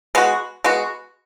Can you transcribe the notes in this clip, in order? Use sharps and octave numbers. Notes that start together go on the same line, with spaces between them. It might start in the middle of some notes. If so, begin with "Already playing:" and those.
G#3 B3 F#4
G#3 B3 F#4